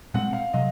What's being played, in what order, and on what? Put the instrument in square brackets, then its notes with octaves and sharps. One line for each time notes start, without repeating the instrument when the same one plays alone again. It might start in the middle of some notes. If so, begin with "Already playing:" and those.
[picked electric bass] A#2 G#3 C4 [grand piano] F#5
[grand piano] F5
[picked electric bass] C3 F#3 [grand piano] D#5